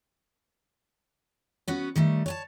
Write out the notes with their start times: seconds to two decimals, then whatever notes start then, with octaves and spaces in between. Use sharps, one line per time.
1.68 B3 C#4 F#4
1.96 D#3 G3 A3
2.26 C#5 G#5 A5